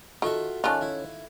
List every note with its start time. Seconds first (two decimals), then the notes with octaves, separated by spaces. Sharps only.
0.22 D#3 F4 F#4 A4 E5 A5
0.64 D#3 C#4 F4 A4 D5 A5 F#6
0.81 E4